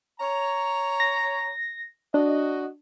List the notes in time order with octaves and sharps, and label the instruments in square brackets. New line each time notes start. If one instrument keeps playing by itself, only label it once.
[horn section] C#5 A#5
[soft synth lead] A#6
[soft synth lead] D4 [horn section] F#4 D#5